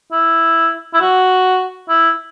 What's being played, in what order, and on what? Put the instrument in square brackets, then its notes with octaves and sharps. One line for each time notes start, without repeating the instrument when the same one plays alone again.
[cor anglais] E4
E4
F#4
E4